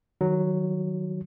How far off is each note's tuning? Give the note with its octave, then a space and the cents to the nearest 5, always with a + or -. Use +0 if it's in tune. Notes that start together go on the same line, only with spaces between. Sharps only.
D#3 +0 F#3 +0